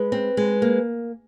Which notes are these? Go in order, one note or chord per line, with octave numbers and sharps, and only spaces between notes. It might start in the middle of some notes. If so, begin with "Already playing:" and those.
Already playing: G#3 B4
C4
G#3
A#3